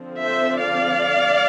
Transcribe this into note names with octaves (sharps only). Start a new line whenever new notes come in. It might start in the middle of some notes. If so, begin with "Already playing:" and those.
Already playing: D3 F3 C4
C5 E5
D5 F5